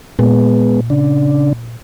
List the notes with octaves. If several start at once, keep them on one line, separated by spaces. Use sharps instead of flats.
A#2 G#3 B3
C#3 D4